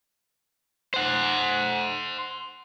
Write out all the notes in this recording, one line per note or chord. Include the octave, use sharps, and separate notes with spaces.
C5 F#5